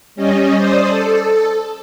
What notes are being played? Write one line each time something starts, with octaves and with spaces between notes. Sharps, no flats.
G3 C#4 D#5
C5 D5 D#6
A4